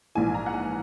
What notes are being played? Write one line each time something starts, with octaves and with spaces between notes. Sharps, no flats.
A#1 G#2 E3 G#5
A#5
F#5
G#5